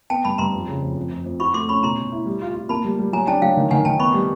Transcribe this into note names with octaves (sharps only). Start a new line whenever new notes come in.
B3 G5 A5
G2 A5 B5
G2 A#5 C6
F2
C#3
F2
F2
F2
F2
F#4 B5 C#6
A3 C6 D6
C#4 B5 C#6
B2 A#5 C6
B2
E4
G3
F4
F4
A#3 A5 B5
G3
G3
F#3 G#5 A#5
D4 G5 A5
F#3 F5 G5
D#3
D#3 F#5 G#5
D#3 G5 A5
B3 B5 C#6
G3